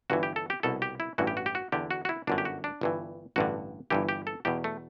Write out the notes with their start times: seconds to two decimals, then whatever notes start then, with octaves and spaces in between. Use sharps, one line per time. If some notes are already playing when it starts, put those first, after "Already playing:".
0.10 G1 G2 E3 F#4
0.23 G4
0.36 A4
0.50 G4
0.63 C2 B2 A4
0.82 G4
1.00 E4
1.18 A1 G2 E3 F#4
1.27 G4
1.37 F#4
1.46 G4
1.55 F#4
1.72 E2 D3 G4
1.91 F#4
2.05 F#4
2.09 E4
2.27 G1 F#2 D3 D4
2.38 G4
2.45 F#4
2.64 D4
2.81 G1 G2 E3
3.36 A1 G2 D3 F#4
3.90 G1 G2 E3 G4
4.09 G4
4.27 A4
4.45 E2 B2 G4
4.64 A3